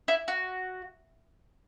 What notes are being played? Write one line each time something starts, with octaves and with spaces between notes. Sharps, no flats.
E4
F#4